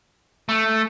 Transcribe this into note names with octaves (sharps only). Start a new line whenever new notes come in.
A3